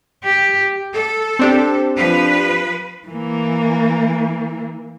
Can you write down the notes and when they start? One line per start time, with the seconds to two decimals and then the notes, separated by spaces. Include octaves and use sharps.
0.24 G4
0.93 A4
1.39 C4 D4 G4
1.97 F3 B4
3.08 E3 A#3